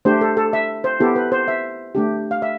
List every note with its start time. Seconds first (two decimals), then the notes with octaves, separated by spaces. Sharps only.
0.05 A3 D4 G4 C5
0.21 A4
0.37 A4
0.53 E5
0.84 C5
1.00 B3 E4 G4 A4
1.16 B4
1.32 C5
1.48 E5
1.95 A3 D4 G4
2.31 F5
2.42 E5